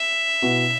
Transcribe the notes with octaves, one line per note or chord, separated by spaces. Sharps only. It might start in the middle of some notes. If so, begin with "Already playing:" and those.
Already playing: E5
B2 B3 E4